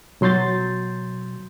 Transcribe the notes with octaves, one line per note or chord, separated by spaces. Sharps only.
B2 F#3 C6 G6 A6